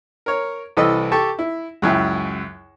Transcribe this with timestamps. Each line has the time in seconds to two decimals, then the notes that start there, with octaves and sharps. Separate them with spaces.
0.26 A#4 C#5
0.77 C2 E3 A4 B4 D#5 E6
1.12 G4 A4 A5 C#6
1.39 E4
1.82 C#2 F#2 E4 G5